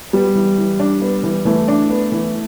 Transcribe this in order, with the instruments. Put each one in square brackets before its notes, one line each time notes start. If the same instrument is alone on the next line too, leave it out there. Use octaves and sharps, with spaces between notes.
[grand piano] G3 [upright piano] B3
[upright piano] E3
E3
D4
B3
E3
[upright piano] E3 [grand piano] A3
[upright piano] D4
B3
E3